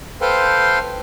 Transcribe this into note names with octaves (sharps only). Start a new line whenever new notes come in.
A4 B4 C5 F5 G5 C6